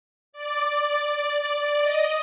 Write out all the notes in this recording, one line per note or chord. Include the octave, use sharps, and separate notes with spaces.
D5
D#5